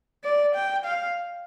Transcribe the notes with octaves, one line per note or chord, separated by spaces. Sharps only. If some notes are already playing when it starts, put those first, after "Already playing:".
D5
G5
F5